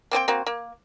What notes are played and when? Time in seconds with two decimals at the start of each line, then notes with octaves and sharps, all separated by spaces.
0.11 A#3 C4 C5 G5
0.28 A#3 C4 F#4
0.46 A#3